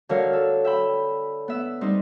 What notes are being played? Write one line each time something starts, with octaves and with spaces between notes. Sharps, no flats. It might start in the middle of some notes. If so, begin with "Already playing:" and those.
D3 F#3 A#4 C#5 F5
A4
E5 G5 B5
B3 E5
G3 C4 D#4